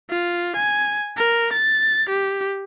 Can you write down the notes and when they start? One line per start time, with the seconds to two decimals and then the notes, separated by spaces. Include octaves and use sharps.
0.10 F4
0.56 G#5
1.17 A#4
1.53 A6
2.09 G4